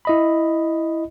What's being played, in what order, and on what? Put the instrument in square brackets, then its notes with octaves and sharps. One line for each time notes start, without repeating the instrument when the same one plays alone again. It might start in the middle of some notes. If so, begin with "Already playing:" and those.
[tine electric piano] E4 D#5 B5